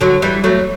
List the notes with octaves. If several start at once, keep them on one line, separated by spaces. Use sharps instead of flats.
D3 F#3
E3 G3
F#3 A3